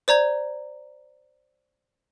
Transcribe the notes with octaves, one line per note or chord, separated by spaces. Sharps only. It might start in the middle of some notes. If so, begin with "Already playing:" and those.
C5 D5 A#5 G#6